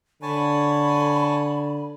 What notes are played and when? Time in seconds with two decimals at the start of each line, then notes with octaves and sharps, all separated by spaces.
0.22 D3 C#5 G#5 A5 B5